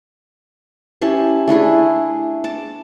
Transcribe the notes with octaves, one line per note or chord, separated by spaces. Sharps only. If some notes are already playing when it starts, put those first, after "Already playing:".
C#4 E4 G4 A5
A3 D4 E4 G#4
A5 D6